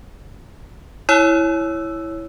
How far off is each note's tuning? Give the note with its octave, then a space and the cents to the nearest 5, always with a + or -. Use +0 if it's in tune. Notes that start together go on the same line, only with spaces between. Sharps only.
E4 +0 C#5 +0 E6 +0